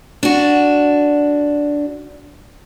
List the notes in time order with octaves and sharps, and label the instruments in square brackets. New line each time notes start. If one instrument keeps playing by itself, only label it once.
[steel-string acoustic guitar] D4 F#4